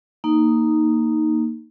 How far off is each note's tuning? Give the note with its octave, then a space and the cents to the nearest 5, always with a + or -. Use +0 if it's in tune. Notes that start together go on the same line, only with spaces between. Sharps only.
A#3 +0 D#4 +0